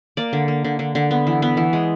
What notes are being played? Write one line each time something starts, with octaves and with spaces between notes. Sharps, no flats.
A#3 D5
D3
A#3
D3
D3
D3
B3
E3
B3
E3
G#3